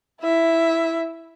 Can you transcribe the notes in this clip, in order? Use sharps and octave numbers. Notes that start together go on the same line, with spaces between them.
E4 E5